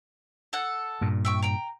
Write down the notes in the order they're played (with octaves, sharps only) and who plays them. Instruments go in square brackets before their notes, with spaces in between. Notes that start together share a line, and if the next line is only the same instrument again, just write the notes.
[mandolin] A4 F#5
[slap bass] G2 A#2
[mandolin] E5 G5 C#6
G5 A#5